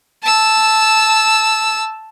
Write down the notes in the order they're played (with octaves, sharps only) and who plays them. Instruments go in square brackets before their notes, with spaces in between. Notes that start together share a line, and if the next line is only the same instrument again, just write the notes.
[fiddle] A5 E6